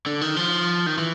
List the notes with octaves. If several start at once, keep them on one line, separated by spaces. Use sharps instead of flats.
D3
D#3
F3
D#3
E3